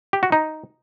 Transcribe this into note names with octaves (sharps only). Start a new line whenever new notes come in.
G4
F#4
D#4